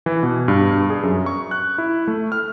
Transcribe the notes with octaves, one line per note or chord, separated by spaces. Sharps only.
E3
B2
G2
G2
G#4
F#2
C#6
F#6
E4
A3
F6